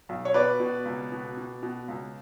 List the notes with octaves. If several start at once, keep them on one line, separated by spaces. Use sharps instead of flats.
B1
C#5
B2 B4 D5
B2
C#2
B2
B2
B2
C#2